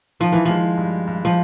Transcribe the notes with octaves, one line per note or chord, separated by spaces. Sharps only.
D#3 F3
E3
F3 G#3
G2
G2
F3